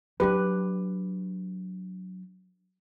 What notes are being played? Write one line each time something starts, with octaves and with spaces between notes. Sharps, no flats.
F#3 D4 G4 B4